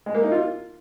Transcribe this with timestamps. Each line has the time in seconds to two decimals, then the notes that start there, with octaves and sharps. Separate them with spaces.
0.06 G#3
0.15 A#3
0.23 D#4
0.32 F4